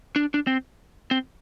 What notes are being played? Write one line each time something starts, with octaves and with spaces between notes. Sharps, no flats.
D4
D4
C4
C4